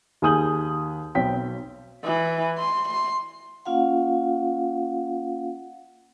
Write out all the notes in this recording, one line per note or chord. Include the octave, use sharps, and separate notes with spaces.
D#2 G#4 G#5 D#6 G6 F#7
B1 C4 C#5 G5 B6
E3
C6
C6
A#3 C#4 F4 F5 F#5